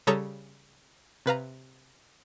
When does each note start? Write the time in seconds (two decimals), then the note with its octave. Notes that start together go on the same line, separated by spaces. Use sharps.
0.07 C#3 G3 A4 C#5 A#5 D#6
1.26 C3 B4 F5 A#5